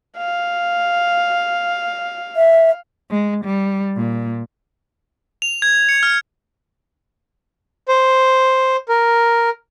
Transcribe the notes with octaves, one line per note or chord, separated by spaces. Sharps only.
F5
E5
G#3
G3
A#2
F7
G#6
C#7
F6
C5
A#4